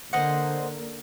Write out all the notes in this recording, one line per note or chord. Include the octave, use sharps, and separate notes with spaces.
D3 A#3 C5 D#5 F#5